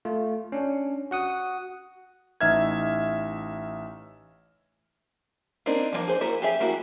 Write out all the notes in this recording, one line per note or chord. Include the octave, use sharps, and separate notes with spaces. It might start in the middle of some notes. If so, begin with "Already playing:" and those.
A3 F4
C#4 D4
F#4 F#5 D#6
A1 D#4 E5 F6 G#6
A#3 C4 D4 D#4
F3 G3 A#3
G#4 C5
A#3 E4 F#4 A#4
G4 G#4 E5
A#3 E4 F#4